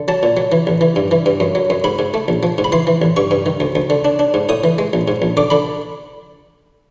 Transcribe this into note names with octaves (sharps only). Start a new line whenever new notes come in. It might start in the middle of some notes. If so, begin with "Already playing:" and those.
Already playing: D3
F#3 A5
A#2
F#3
E3
A1
E3
G2
E3
G2
F#2
F#3
F#2
G#2 B5
G#2
A3
A#1
F3
G#2
B5
E3 C6
E3
A1
G2 C#6
G2
D#3
D2
D2
D3
D4
D4
G#2
A2 D#6
E3
G#3
A#1
G#2
A#1
D3 D6
D3 B5